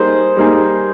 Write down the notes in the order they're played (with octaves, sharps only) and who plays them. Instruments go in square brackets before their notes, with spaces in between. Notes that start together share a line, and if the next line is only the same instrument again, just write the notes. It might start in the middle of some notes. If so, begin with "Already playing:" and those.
Already playing: [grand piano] G3 A#3 D#4 G#4 [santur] C5
[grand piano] G3 A#3 D#4 G#4